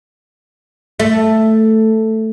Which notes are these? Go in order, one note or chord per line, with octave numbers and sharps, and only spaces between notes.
A3